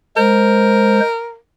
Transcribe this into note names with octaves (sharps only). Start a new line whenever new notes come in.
G#3 A#4 C5